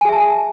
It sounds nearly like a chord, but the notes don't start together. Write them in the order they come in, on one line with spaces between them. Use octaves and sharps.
G#5 G#4 E5 A5